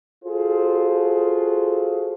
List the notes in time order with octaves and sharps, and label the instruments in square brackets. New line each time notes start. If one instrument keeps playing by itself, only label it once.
[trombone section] F4 F#4 G#4 A4 C5